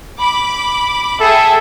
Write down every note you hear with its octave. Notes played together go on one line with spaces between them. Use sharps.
B5 D6
G#4 A4 E5 G5